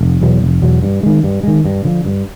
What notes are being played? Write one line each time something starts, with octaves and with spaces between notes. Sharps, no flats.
F1
E2 B2 F#3
F1
E2 B2 F#3
G2
D#3 G#3
G2
D#3 G#3
G2
D3 F3
G2